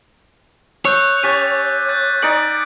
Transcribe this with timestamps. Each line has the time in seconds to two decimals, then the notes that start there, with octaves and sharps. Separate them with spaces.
0.85 C#5 E6 F#6 G6
1.23 C#4 G4 A6 B6 D#7
1.89 F#6 G6 A6
2.22 D#4 D5 G#5 C#7 D7 F#7